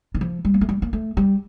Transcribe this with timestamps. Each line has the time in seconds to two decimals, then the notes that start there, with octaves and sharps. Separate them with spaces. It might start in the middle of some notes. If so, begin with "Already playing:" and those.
0.14 D#3
0.21 F3
0.45 G3
0.54 A#3
0.61 A3
0.69 G3
0.82 A#3
0.93 A3
1.17 G3